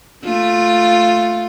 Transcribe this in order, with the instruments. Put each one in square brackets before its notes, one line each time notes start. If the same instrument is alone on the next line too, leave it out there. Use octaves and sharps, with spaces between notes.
[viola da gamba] A3 F4